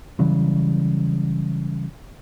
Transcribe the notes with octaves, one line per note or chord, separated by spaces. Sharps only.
C#3 E3 F#3 G3